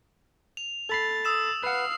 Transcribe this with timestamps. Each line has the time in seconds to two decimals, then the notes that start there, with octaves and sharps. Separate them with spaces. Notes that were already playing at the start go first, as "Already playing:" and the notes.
0.57 F7
0.89 A4 B5 A6 C7
1.25 D#6 E6 E7
1.64 B4 F5 F#5 C7